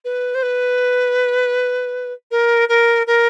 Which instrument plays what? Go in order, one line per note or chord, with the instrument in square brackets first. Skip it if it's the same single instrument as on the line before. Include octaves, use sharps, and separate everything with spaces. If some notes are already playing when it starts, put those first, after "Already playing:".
[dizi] B4
C5
B4
A#4
A#4
A#4